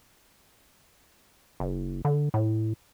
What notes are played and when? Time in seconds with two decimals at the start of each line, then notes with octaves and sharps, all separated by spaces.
1.60 F#1
2.05 D3
2.34 A2